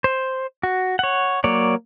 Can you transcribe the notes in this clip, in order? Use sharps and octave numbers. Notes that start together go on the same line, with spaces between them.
C5
F#4
C#5 F#5
F#3 A#3 C#5 D5